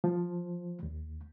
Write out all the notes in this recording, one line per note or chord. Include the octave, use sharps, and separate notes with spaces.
F3
D#2